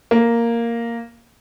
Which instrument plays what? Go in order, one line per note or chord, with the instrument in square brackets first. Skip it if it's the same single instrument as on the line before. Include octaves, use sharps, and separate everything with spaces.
[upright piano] A#3